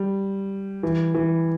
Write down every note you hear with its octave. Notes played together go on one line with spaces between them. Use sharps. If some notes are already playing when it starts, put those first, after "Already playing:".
Already playing: G3
E3
E3